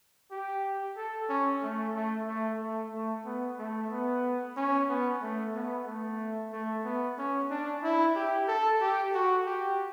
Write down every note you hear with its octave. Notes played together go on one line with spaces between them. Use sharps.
G4
A4
C#4
A3
A3
A3
A3
A3
B3
A3
B3
C#4
B3
A3
B3
A3
A3
B3
C#4
D4
E4
G4
A4
G4
F#4
G4